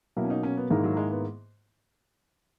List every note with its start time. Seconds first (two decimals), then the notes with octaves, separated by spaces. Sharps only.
0.16 B2 F#3 A#3 E4
0.25 C#4
0.30 D#4
0.43 C#4
0.57 B3
0.70 G#2 D#3 G#3 A#3 E4
0.84 F#3
0.97 G#3
1.11 B3